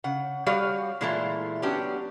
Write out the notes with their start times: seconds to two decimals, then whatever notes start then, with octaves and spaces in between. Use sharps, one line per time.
0.04 C#3 F#5
0.46 G3 F#4 G4 C#5 F5
1.01 A#2 E3 G#3 A3 E4 F4
1.62 F#3 B3 C#4 D4 G4